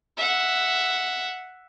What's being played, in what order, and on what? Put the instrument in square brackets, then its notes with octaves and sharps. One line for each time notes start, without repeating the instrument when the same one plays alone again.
[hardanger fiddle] E5 F#5